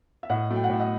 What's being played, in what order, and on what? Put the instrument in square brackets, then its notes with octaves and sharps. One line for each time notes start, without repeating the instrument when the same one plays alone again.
[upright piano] E5
A2 D#5 F#5
F#3 A3
G5
F#5
A2 E5
D#5 F#5